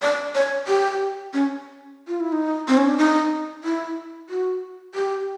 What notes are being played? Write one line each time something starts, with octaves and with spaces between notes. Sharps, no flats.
D5
C#5
G4
C#4
F4
E4
D#4
C4
C#4
D4
D#4
E4
F#4
G4